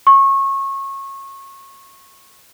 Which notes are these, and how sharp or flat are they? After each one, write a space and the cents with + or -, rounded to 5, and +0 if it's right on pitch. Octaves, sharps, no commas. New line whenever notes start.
C#6 -25